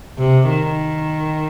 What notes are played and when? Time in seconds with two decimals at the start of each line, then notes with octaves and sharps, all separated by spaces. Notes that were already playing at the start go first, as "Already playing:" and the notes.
0.18 C3
0.50 D#3